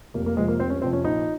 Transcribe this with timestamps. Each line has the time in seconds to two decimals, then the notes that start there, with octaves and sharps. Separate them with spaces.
0.14 F1 A#3
0.26 A#3
0.37 F2 C3 F3 G#3
0.48 A#3
0.59 F1 C4
0.70 C#4
0.82 F2 C3 F3 C4
0.93 C#4
1.04 A#1 D#4